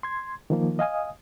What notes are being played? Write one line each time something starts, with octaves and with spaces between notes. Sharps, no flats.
C6 G#6
D#3 F3 A#3
D#5 F5 G#5 D#6